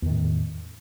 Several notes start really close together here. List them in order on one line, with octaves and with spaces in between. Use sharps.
E2 D#3 A2